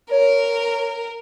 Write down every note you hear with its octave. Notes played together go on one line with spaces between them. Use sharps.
A#4 C#5